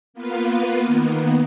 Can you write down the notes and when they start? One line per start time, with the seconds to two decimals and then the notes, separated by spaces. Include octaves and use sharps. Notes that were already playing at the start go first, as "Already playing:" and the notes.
0.14 A#3 B3 F4 B4
0.86 D#3 A#3 B3